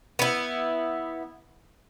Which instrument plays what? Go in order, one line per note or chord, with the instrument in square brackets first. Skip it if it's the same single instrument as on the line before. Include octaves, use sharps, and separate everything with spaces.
[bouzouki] B3 E4